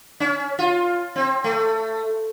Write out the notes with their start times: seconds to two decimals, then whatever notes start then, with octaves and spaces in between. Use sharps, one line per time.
0.20 C#4
0.59 F4
1.16 C4
1.44 A3